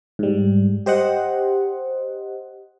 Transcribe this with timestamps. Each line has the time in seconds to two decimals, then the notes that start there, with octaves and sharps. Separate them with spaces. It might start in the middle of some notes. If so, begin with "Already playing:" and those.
0.19 G#2 G3
0.86 G4 C5 D#5 F#5